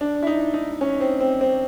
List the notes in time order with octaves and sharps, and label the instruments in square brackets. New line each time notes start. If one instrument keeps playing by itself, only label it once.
[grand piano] D4
E4
D#4
D#4
C#4
C4
C4
C4